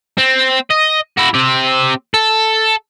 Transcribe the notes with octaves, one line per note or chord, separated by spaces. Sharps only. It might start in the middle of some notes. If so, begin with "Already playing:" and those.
C4
D#5
E4 F#4
C4 G4
A4